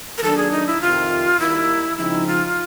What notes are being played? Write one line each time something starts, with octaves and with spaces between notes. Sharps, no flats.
A#4
D#3 F#3 A#3 D4 A4
G#4
D#4
E4
F2 C3 D#3 F4
D#3 G3 A#3 D#4 E4
C#3 F3 G#3 C4 D#4 E4
F4